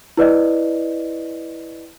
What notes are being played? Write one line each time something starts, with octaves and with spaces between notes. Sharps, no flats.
E4 B4 D5 D#5